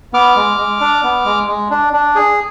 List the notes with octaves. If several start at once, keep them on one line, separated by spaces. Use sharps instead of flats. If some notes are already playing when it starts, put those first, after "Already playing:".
B3 D6 F6
G#3
G#3
D4
B3
G#3
G#3
D4
D4
G#4